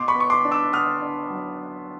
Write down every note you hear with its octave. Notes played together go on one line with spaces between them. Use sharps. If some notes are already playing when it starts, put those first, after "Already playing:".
Already playing: B2 C6 D6
B5 C#6
B3
C#6
C6 D6
D4
D6 E6
B3 D#6 F6
D4
F#3